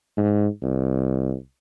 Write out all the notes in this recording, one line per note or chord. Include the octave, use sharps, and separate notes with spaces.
G#2
C2